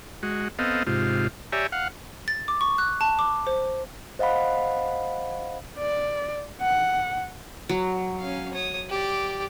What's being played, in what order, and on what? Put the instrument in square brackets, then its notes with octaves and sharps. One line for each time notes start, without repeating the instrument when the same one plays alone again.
[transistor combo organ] G#3 F#4
B3 C4 A4 D#5 F5
G#2 C3 F4
G4 C#5 D5 E5 G#5 A#5
F5 F#5
[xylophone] A6
D6
C#6
F#6
A5
D6
C5
[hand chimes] C5 D#5 F5 F#5 B5
[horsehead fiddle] D5
F#5
[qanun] F#3
[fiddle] C#4 F5
C#5 D#6
G4 D5